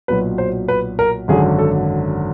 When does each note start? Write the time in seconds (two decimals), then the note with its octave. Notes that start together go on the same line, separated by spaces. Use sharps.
0.08 B1 A#2 F#3 B4
0.38 C5
0.68 B4
0.99 A#4
1.28 G#1 F#2 D3 F#3 G#4
1.59 A4